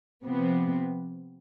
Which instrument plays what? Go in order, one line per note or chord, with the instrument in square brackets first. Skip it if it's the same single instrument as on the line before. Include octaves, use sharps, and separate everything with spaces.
[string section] C3 F3 B3